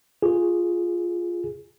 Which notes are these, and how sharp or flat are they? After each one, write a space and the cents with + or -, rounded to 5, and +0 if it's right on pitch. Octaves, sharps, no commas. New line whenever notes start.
F4 +0 G#4 +0